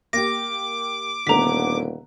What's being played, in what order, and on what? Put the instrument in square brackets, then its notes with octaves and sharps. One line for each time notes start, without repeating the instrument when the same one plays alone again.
[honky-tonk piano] A#3 G4 [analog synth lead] D6 [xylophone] A#6
[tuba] D#1 [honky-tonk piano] D3 A3 B3 [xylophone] A#5 B6